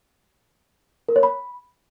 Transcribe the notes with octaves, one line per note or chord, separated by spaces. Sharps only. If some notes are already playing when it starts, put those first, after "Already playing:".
A#4
C#5
B5